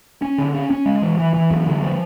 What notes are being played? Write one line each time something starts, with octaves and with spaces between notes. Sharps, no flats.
C#4
D3
C#4
C#4
G#3
E3
E3
E3
F#2
D3
F3